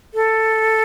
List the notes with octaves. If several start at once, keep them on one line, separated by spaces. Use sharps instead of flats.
A4